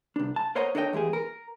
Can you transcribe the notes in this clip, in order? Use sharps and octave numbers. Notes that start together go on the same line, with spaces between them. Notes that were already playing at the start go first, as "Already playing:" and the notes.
C2 D4
A5
A#4 C5 C#5 D#5 F#5 A#5
D4 A4 A#4 C#5 D#5 G5
E2 G#3 G4 G#4
A#4